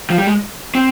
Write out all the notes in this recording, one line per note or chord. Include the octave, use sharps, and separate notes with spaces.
F3
G3
G#3
C4